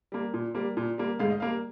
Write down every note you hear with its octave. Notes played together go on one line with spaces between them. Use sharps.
G3 A#3
A#2
G3 A#3
A#2
G3 A#3
G#2 F5
D#5
G3 A#3 F5